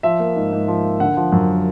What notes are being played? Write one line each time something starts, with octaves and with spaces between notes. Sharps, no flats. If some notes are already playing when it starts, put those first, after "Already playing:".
F3 E5
A#3
G#2
G#2
F3
A#3
D3 F#5
F3
F#2